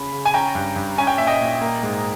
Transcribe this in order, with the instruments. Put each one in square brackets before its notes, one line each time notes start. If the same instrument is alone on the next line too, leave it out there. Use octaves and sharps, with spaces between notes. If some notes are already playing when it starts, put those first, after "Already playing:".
Already playing: [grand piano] C#3 C#4 B5
C#3
G#5
C#4 G5 A#5
G2
G2
C#4 G#5
G5
A#2 E5
D#5 G5
A#2
A#3
G#2